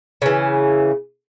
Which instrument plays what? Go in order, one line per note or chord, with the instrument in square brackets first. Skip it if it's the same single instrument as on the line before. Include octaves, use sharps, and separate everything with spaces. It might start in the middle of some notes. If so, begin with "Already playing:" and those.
[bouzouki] C#3 E3